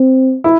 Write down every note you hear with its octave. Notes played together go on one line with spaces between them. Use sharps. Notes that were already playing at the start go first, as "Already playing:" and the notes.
Already playing: C4
E4